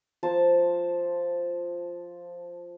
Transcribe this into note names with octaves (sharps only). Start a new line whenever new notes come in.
F3 C5 A5